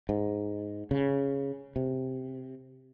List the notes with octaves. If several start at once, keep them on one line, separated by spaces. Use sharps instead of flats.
G#2
C#3
C3